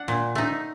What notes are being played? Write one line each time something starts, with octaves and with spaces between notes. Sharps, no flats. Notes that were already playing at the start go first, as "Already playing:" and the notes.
Already playing: D4 F#5
A#2
A3 D#4